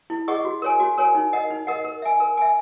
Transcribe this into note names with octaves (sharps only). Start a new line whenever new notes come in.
E4
G#4 D#5 F#5 C#6
F#4
A#4 C#5 G#5
F#4
A#4 C#5 G#5
D#4
A#4 D#5 F#5
D#4
A#4 D#5 F#5
A#4
E5 G#5
A#4
E5 G#5